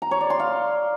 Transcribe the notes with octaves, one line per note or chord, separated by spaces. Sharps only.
A#5
C#5
D5
C6
F5